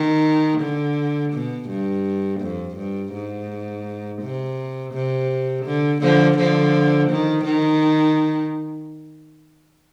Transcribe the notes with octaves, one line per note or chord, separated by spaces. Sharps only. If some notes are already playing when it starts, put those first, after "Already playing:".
Already playing: D#3
D3
B2
G2
F2
G2
G#2
C3
C3
D3
D3 F3
D3 F3
D#3
D#3